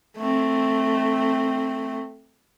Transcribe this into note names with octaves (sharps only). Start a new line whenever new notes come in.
A3 C4